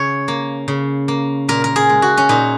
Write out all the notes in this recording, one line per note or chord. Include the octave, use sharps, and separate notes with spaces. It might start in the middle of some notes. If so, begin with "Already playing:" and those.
Already playing: C#3 C#5
A#3
C#3
A#3
A#2 A#4
A#4
G#4
G#3
F#4
C#4
A#2 D#4